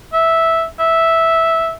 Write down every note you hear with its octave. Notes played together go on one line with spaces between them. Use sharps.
E5
E5